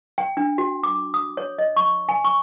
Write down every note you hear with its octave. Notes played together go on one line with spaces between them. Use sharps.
G5
D4
F#4
D6
D#6
C#5
D#5
C#6
G#5
C#6